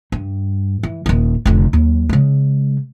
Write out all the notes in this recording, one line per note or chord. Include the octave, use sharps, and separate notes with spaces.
G2
E3
D#1 D#3
F1 D3
D#2 F#3
C#3 G#3